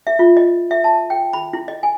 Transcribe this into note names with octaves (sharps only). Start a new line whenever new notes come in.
E5
F4
D#5
E5
A5
G5
B5
E4
D#5
G#5